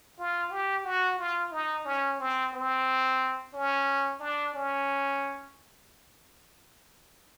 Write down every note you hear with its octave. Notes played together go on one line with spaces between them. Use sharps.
F4
G4
F#4
F4
D#4
C#4
C4
C4
C#4
D4
C#4